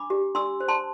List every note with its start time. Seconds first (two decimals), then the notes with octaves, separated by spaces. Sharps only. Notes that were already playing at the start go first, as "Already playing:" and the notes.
Already playing: D4 B5 D6
0.10 G4
0.35 D4 C6 E6
0.60 C5
0.68 A5 C6